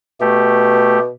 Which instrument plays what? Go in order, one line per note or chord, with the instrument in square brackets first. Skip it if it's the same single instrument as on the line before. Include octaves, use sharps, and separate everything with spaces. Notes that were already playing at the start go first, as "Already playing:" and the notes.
[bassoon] B2 [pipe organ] A3 G4